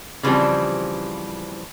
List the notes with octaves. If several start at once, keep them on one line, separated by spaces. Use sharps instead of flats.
C#3 E3 F3 G3 C4